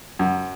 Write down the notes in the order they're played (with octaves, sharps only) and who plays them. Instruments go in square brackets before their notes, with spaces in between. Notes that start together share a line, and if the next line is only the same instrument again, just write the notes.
[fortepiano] F#2